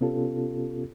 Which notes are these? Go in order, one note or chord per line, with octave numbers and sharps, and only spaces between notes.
C3 B3 C#4 F4 G4 A4